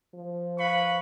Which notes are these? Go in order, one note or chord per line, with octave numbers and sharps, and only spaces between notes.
F3
B4 F5 B5 C#6